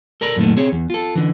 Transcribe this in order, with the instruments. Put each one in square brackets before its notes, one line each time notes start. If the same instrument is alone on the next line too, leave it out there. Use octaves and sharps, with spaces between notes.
[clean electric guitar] A4 A#4 D5 A#5 B5
F#2 A#2 D#3 A3
C4 G#4 C#5
E2
F4 A4
D3 E3